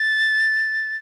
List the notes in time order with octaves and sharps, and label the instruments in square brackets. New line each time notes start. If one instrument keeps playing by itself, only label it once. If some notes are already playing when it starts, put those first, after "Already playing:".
Already playing: [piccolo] A6